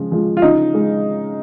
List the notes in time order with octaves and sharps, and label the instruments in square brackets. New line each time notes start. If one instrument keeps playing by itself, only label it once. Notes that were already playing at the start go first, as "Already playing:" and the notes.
Already playing: [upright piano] C#3 F3 G#3
F3 G#3
F4
C#3 D#4
G#3